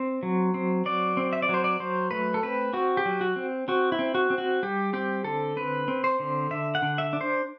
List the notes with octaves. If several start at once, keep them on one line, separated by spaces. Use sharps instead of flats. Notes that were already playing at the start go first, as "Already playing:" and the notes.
Already playing: C4
F#3
C4
F#3 D5
C4
E5
D5
F#3 C5
D5
F#3 C5
A3 B4
A4
C4 B4
C4 F#4
G4
F#3
F#4
C4
C4 F#4
E4
C4
F#4
C4
F#4
G3 G4
C4 G4
D3 A4
C4 B4
C4
C5
D3
D3 E5
F#5
D3
E5
D4
C5